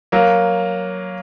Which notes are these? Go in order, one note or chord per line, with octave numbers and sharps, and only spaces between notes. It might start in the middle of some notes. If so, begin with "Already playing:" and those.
F#3 A#3